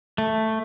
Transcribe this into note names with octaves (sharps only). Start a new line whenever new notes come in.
A3